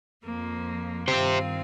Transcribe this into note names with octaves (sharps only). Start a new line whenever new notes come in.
F2 F3 A#3
G2 D#3 C4 F4 G4 C5